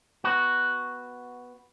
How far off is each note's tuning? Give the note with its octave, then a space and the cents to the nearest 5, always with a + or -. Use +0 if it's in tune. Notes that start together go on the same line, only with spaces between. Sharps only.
B3 +0 F#4 +0